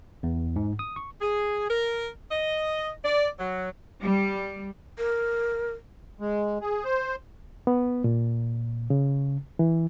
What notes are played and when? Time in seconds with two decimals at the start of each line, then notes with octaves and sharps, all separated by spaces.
0.23 E2
0.56 G#2
0.79 D#6
0.96 C#6
1.21 G#4
1.70 A#4
2.31 D#5
3.04 D5
3.39 F#3
4.02 G3
4.98 A#4
6.20 G#3
6.61 G#4
6.84 C5
7.67 B3
8.04 A#2
8.90 C#3
9.59 E3